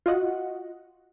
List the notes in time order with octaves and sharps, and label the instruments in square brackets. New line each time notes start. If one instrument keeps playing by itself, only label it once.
[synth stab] F4 F#4 D#5 F#5